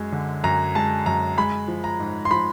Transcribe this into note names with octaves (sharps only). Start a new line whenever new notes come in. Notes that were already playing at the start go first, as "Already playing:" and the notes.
Already playing: F#2 G#3
D3
F#2 A#5
G#3 A5
F#2 A#5
G#3 B5
F3
A#5
G#2
C6
F3 B5